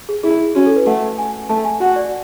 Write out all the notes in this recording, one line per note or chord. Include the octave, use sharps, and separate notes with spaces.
G#4
E4 G#4
C#4 F#4
A4
B4
A3 F#5
G#5
A3 A5
G#5
F#4 F#5
D5